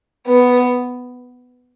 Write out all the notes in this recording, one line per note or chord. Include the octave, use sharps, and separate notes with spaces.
B3